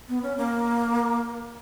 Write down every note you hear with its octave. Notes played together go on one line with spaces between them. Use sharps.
B3
C#4
A#3